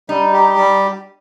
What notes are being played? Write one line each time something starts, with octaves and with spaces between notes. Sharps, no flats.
G3 D#4
G4
G3